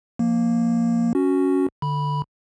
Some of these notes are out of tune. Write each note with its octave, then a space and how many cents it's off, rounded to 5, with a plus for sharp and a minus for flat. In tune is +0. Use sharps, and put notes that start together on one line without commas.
F3 +0 A#3 +0
C#4 +5 F#4 +0
D3 +0 B5 -10